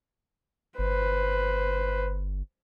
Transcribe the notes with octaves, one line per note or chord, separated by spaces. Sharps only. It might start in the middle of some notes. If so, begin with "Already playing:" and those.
G1 B4 C5